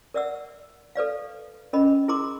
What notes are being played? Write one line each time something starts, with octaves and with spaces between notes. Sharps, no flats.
A#4 D5 E5 F#5 E6
A4 B4 D5 F5
C#4 A#4 D#5 B5
E4 G#4 A#4 A#5 C6 D6